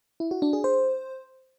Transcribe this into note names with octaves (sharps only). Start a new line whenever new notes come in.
E4
F#4
D4
G#4
C5